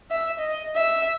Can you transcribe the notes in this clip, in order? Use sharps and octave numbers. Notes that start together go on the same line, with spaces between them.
E5
D#5
E5